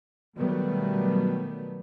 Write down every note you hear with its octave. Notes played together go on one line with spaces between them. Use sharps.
B2 D#3 F#3 G3 A3 B3